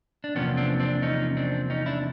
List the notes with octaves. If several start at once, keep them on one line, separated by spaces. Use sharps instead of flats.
D4
E2 C3 F3 A#3 B3 C#4
C4 D4
C4 D4
C#4 D#4
C4 D4
C#4 D#4
D4 E4